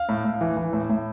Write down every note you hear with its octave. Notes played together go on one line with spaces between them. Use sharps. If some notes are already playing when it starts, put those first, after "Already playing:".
Already playing: F5
A2
A2
E3
E3
A2
A2